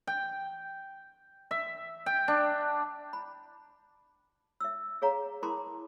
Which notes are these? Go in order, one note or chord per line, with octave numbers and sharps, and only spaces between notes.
G5
E5
G5
D4
B5
E5 E6
G#4 C#5 F5 A#5
E4 A#4 A5 B5 C6 D6